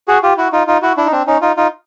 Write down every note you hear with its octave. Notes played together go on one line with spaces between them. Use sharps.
F#4 G#4
F4 G4
E4 F#4
D#4 F4
D#4 F4
E4 F#4
D4 E4
D#4
C4 D4
C#4 D#4
D#4 F4
D#4 F4